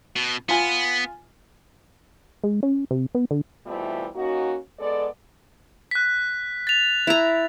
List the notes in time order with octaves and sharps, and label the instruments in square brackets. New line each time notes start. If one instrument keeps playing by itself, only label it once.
[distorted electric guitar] B2
[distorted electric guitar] B3 [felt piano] F4 G#5
[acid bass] G#3
C#4
C3
B3
D3
[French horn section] B2 E3 G3 A3 C4 F4
A#3 C#4 D#4 F#4
G#3 B3 A4 D5
[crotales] F#6 B6
A6 F7
[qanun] E4 A#5